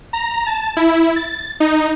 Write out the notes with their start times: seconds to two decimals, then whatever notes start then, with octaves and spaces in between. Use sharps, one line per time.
0.13 A#5
0.47 A5
0.77 E4
1.16 A6
1.60 D#4